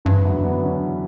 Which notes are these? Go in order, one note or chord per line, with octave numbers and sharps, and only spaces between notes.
G2 C#3 E3
F#2
D3 F#3
E2
F#2 B3 D4
C#4 E4